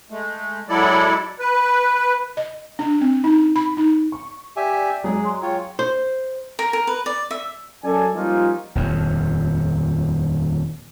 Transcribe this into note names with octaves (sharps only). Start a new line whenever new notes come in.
G#3 A3
F#3 G#3 E4 A4 D5
B4
D#5
D4
C4
D#4
B5
D#4
C#6
G4 D5 E5 G#5
F#3 G#3 G#4
C6
F4 C#5 G5
C5
A#4
A#4
B4
D5
E5
F#2 A4 D5 G#5
F3 G3 A#3 C#4 D#4 F4
D#1 F2